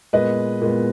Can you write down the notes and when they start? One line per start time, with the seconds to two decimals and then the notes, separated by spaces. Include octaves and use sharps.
0.13 A#2 G#3 B3 B4 D#5
0.61 A#2 G#3 B3